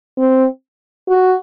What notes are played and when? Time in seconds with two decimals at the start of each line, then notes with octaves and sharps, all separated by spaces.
0.18 C4
1.09 F#4